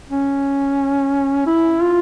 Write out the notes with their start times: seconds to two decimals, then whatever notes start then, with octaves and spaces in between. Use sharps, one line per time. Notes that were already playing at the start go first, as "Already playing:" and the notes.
0.10 C#4
1.47 E4
1.82 F4